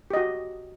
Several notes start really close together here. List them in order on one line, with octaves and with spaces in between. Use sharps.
G4 D#5 F#4